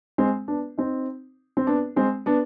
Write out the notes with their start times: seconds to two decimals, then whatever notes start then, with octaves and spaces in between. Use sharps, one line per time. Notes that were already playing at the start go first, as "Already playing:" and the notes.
0.18 G#3 C4
0.48 B3 D4
0.78 C4 D#4
1.57 C4
1.67 B3 D4
1.96 G#3 C4
2.26 B3 D4